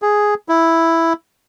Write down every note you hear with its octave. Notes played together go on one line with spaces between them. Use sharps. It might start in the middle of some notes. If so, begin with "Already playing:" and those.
G#4
E4